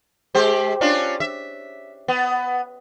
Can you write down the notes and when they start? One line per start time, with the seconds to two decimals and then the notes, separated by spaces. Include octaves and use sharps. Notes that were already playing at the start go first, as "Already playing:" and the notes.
0.35 G#3 G4 C5
0.81 C#4 D4 F4
1.20 E5
2.08 B3